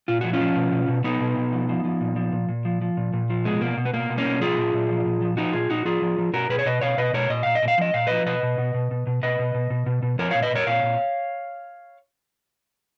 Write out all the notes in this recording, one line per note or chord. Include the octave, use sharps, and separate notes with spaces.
A#2 F4
F3 F#4
C#4 F4
F3
B2
B2
B2
B2 B3 D#4
B2
B2
F3
F3
F3
A#2
F3
A#2
A#2
F3
F3
A#2
A#2
F3
B2 G#3
B2 A#3
B2
B3
B2 A#3
B2
A#3 C#4
B2
F3 F4 G#4
A#2
A#2
F3
A#2
F3
F3 D#4 F#4
A#2 F4 G#4
A#2 D#4 F#4
F3 F4 G#4
F3
F3
B2 F#4 A#4
B2 G#4 B4
C#5
B2 B4 D#5
B2 C#5 F5
B2 B4 D#5
B2 A#4 C#5
A#2 D#5
A#2 F5
D#5
A#2
F5
F3 D#5
A#2 F5
F3 B4 D#5
B2 B4 D#5
B2
B2
B2
B2
B2
B2 B4 D#5
B2
B2
B2
B2
B2
F3 A#4 C#5
A#2 C#5 F5
B4 D#5
A#2 A#4 C#5
A#2 C#5 F5
A#2